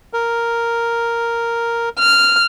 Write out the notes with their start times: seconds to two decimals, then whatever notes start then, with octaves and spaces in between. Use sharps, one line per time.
0.13 A#4
1.99 F6